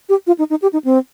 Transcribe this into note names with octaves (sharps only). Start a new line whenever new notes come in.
G4
F4
D#4
D#4
G4
D#4
C4